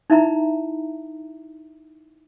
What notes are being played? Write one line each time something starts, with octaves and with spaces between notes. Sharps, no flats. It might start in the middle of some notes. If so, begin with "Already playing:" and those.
D#4 E4 E5 A#5 B5